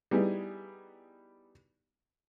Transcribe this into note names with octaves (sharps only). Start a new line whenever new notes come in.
G3 B3 D#4 E4 G#4